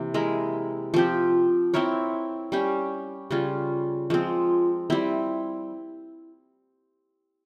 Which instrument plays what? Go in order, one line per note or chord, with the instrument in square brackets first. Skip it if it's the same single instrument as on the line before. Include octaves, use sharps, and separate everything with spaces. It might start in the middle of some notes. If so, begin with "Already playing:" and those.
Already playing: [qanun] C3 E3 A#3
G#3 E4 A#4
F3 C4 G4
C4 E4 A#4 C#5
G3 C#4 G4
C#3 G3 C#4 F4
F3 G#3 C4
G3 C4 E4